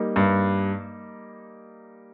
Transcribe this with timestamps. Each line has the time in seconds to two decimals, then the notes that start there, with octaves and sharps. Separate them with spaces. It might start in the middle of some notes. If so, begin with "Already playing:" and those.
Already playing: G3 A#3 D#4
0.16 G2